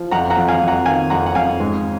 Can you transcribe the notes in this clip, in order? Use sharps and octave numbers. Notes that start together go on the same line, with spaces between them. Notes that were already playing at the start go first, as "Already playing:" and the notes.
Already playing: F3
F2 F#5 A#5
F#5 A#5
F2
F5 G#5
F2
F#5 A#5
D#3 F5 G#5
F2 F#5 A#5
F#5
F2 F5 G#5
G#2